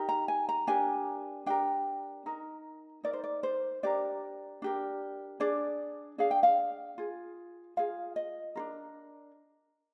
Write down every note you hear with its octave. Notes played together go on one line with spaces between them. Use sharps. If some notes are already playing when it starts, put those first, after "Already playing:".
Already playing: D#4 G4 A#4
A#5
G#5
A#5
D4 G4 A#4 G#5
D4 G4 A#4 G5
D#4 A#4
D#4 A#4 D5
C5
D5
C5
D4 G4 A#4 D5
D4 G4 A#4
D4 G#4 D5
D4 G#4 F5
G5
F5
F4 G#4
F4 G#4 F5
D#5
D4 F4 A#4